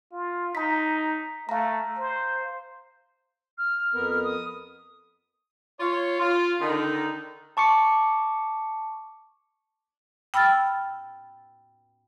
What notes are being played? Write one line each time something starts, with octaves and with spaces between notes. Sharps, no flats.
F4
D#4 A#5 B6
A3 F5 A#5
C5
F6
F2 B3 A#4
F6
D#6
F4 C#5
F4
D3 D#3 D#4
A5 C#6 D6 C#7
G5 B5 E6 F6 A6